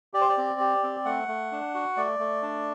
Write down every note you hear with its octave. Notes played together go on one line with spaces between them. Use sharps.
G4 D5
C5
D5
C4
G4
C4
A3 F#5
A3
D4
F#4
A3 D5
A3
D4